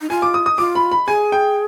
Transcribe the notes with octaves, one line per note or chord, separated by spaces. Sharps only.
D#4
F4 G#5
D6
D#6
D#6
F4 D6
B5
B5
G#4 G#5
G5